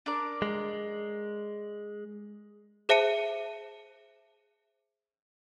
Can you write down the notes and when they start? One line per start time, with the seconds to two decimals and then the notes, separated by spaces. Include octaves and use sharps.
0.06 D4 A#4 D5
0.42 G#3
2.89 G#4 C5 E5 A5 C#7 D#7